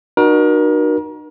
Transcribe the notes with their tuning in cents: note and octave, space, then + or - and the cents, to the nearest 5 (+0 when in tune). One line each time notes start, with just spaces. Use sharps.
D#4 -40 F#4 +0 A#4 +35